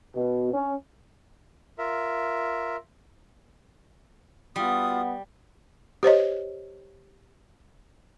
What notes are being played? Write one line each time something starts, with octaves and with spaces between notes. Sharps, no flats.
B2
C#4
F4 A#4 E5
G3 B3 F4 F#4 D#6
G4 C5 C#5 D#5